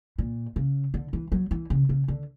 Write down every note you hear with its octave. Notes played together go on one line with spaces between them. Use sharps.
A#2
C#3
D3
E3
F#3
E3
C#3
C#3
D3